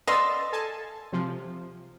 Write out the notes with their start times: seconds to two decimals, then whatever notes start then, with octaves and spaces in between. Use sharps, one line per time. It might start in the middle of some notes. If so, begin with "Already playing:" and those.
0.07 D5 D#5 F5 C6 E6 A6
0.52 A4 G#5 A5
1.12 C3 F3